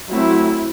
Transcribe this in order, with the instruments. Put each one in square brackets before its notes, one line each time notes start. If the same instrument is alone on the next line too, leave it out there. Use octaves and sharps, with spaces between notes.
[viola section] F#3 A3 C4 E4